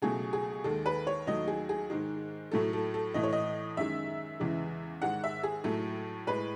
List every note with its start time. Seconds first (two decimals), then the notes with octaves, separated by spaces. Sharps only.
0.02 C#2 B2 F#3 A3 G#4
0.33 G#4
0.64 D#2 D#3 G#3 A4
0.86 B4
1.07 C#5
1.27 D#2 D#3 F#3 A3 D#5
1.48 G#4
1.69 G#4
1.90 G#2 D#3 G#3
2.51 A2 F#3 A3 A4
2.73 A4
2.94 A4
3.14 A2 E3 A3 D#5
3.23 C#5
3.33 D#5
3.77 F#2 D#3 G#3 E5
4.40 E2 C#3 E3 G#3
5.02 G#2 D#3 G#3 F#5
5.24 E5
5.43 G#4
5.64 A2 F#3 A3 A4
6.27 A2 G#3 B4